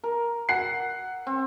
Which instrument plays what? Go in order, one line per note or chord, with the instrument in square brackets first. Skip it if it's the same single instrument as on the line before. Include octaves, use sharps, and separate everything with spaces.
[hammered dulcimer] A#4
[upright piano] F#5 C7
[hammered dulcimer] C4